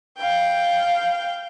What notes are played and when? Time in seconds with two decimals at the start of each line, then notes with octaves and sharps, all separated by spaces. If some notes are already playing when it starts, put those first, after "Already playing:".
0.19 F5 G5